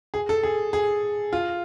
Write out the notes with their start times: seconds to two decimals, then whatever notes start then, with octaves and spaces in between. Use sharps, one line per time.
0.14 G#4
0.29 A4
0.43 G#4
0.73 G#4
1.33 F4